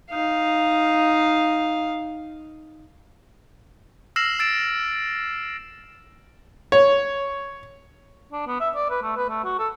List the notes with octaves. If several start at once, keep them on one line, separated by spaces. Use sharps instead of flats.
D#4 F5
E6 F6 A#6 C7 E7 F#7
E6 A6 D7 E7
C#5
D4
B3
E5
D5
B4
A3
B4
A3
F#4
A4